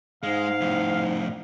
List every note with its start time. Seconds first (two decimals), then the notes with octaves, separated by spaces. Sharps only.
0.23 G#2 G#3 F5
0.61 F2 A2